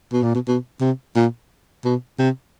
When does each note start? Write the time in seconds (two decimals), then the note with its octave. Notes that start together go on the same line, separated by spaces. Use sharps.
0.13 B2
0.23 A#2
0.35 B2
0.47 B2
0.81 C3
1.16 A#2
1.85 B2
2.19 C3